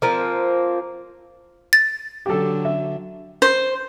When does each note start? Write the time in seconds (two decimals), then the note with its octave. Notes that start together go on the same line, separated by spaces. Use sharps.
0.02 F3 A#3 C4
1.73 A6
2.26 D3 F#3 G4 A4
2.65 E5
3.42 C5